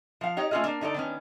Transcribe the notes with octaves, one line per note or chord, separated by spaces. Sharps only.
F3 F5
D#4 G4 C#5 D#5
A3 C#4 F4 G#4 D#5
A#3 D4
D3 D#4 A4 D5
D#3 B3 C#4